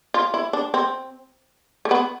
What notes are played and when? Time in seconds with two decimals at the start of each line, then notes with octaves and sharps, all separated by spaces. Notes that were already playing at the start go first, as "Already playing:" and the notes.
0.14 F4
0.34 E4
0.53 D4
0.74 C4
1.85 A3
1.91 B3